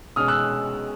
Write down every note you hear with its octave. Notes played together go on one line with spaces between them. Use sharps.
B2 G#3 C#4 D#6 F6
E6 F#6